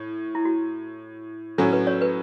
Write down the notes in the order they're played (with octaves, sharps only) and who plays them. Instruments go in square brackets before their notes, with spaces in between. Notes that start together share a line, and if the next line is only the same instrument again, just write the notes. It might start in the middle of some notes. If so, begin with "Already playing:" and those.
Already playing: [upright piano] A2
[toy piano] E4
F#4
[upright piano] A2 F#3 C#4 E4 [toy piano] A4
[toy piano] B4
C#5
B4